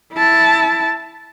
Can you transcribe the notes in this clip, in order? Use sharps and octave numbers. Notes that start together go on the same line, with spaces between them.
E4 A5